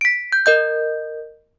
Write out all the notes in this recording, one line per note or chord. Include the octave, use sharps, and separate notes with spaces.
B6 D7
G6
A#4 D#5 G6